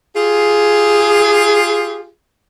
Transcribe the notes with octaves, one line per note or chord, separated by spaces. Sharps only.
F4 G4 G#4